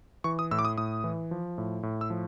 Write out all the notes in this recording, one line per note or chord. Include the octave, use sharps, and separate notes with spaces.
E3 C#6
D#6
A2 E6
D6
D#6
A2 D#6
E3
F3
A2
A2
E6
F3